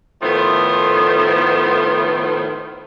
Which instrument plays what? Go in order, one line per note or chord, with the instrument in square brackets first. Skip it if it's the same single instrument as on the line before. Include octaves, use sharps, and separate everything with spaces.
[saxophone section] A2 D#3 F3 A3 B3 C5